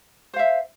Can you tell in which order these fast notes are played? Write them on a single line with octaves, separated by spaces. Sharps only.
C5 F5 E5